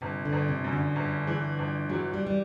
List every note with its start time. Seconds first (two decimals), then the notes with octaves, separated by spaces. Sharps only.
0.01 G1 C3
0.25 D3
0.33 G1
0.48 C3
0.64 F#2
0.72 D3
0.96 G1
1.27 E3
1.59 G1
1.90 E3 F#3
2.14 G3
2.27 G3